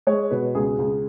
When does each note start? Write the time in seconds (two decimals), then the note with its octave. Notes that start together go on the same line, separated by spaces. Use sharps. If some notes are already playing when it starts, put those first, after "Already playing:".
0.07 G#3 C#5
0.31 B2 B4
0.55 C#2 G#4
0.79 C#2